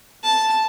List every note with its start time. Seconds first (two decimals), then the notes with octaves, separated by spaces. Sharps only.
0.23 A5